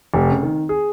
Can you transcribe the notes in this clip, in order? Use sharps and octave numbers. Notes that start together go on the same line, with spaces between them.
F1
C#3
D#3
G#4